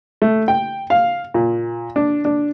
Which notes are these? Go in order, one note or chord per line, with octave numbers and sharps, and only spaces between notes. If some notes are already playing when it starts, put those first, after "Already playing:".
A3
G5
F5
A#2
D4
D4